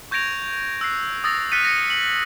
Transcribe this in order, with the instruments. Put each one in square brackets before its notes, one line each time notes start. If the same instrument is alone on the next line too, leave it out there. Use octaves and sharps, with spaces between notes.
[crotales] C#6 G6 G#6 A#6 D7 F7
E6 F#6 C7
D#6 E6 A6 A#6
F6 F#6 A6 B6 C#7 D#7
A#6 C#7
F#7